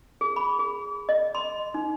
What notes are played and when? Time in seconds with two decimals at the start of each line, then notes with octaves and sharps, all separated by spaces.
0.21 G#4
0.36 B5
0.59 G#4
1.09 D#5
1.35 C6
1.74 D#4